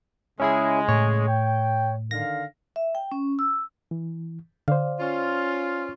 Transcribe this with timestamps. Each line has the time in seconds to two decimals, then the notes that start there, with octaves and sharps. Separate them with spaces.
0.40 C#3 G#3 C#4 E4 G#4
0.88 A2 C#5
1.27 G5
2.11 D3 D#3 F5 A#6
2.76 E5
2.95 G5
3.12 C#4
3.39 E6
3.91 E3
4.68 D3 C5 D5 F5
5.00 C#4 F4